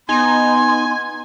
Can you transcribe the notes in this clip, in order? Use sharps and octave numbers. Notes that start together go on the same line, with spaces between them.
B3 D#4 G#5 C6